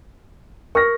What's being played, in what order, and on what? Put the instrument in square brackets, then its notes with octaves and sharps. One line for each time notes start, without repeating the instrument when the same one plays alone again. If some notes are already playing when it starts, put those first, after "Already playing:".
[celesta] A#4 [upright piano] C#6 F6 A#6